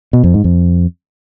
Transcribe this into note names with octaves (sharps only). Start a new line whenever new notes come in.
B2
F2
G#2
F2